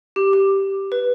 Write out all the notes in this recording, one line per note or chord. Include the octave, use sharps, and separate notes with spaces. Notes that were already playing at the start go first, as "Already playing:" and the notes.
G4
G4
B4